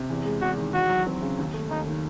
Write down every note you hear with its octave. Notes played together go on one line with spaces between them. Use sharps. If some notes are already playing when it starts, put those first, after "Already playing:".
Already playing: C3
E2
G#3
E2 F#4
D#3
E2 F#4
F#3
C4
C#3
D#2
A3
D#2 D#4
D#3